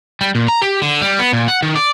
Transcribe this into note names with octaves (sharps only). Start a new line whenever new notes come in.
G3
A#2
A#5
G4
D3
G3
B3
A#2
F#5
D#3
D5